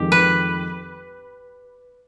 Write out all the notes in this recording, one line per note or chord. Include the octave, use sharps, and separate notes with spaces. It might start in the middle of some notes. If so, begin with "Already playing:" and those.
Already playing: F2 D#3 G#3 G4
B4